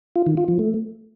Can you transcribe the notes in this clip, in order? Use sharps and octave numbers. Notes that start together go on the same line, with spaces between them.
F4
D#3
F4
F3
A3